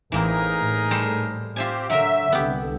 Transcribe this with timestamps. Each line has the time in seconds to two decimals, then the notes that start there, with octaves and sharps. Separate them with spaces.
0.12 A1 E3 A#3 C4 D#4 G#4 A#4
0.58 A2
0.91 G3 A4 C5
1.56 C4 F4 G4 E5 G#5
1.90 D3 F#3 A#4 E5
2.32 C2 D3 B3 G4